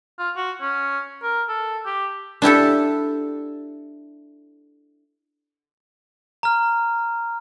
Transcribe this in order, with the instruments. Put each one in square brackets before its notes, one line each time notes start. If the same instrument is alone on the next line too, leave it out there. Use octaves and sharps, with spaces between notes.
[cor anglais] F4
F#4
C#4
A#4
A4
G4
[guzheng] D4 E4 G4 A4
[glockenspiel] A#5 F6